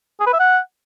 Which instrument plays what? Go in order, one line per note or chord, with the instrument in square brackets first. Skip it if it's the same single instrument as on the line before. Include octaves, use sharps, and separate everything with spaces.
[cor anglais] G#4
B4
E5
F#5